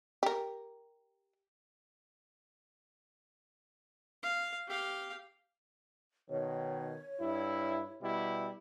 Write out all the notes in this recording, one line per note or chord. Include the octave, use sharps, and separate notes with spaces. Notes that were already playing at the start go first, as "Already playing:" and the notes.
G4 A#4
F5
G4 F5
B2 D#3 C#5
G2 E4
B2 G3 E4